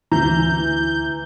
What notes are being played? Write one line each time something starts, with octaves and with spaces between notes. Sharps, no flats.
D2 E3 A#5 G6